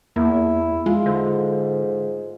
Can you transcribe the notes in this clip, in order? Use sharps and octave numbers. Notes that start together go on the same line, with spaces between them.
E2 A#3 E4
G#3 F4
G#2 D3